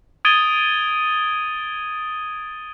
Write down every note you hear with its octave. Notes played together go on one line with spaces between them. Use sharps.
D#6 G#6 A6 D7 D#7 G7